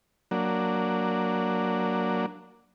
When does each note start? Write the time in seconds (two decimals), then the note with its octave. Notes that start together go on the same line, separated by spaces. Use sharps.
0.31 F#3 A#3 D4